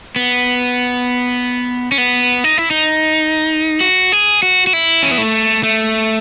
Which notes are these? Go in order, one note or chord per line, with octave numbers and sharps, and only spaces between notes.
B3
C#4
B3
D#4
E4
D#4
F#4
G#4
F#4
F#4
E4
C#4
B3
A3
A3